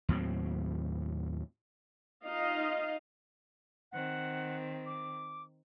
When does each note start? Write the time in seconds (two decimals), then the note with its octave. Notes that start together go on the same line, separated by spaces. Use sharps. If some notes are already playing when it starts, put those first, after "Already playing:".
0.09 D#2 A2 F#3 C4
2.24 D#4 F4 D#5 F5
3.92 D#3 C4 F#5
4.86 D6